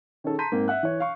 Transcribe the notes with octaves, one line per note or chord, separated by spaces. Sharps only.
D#3 C#4 G#4 A4
A5 A#5 C6 G6 B6 D#7
G#2 A#3 C4
E5 F#5 F#6
E3 C#5
F5 C#6